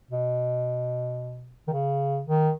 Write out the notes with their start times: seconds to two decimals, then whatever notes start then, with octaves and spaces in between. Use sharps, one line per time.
0.11 B2
1.67 D#3
1.72 C#3
2.26 D#3